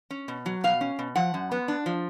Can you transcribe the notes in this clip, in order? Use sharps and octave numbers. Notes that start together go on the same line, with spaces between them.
C#4
B2
F#3
B2 F5
C#4
B2
F3 F#5
F#2
B3
D4
F3